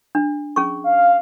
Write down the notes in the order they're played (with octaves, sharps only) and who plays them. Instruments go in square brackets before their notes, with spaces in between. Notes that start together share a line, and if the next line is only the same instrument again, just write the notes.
[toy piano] D4
C#4 G#4 C#6
[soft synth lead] F5